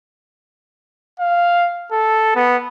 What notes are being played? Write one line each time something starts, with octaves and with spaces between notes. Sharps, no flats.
F5
A4
B3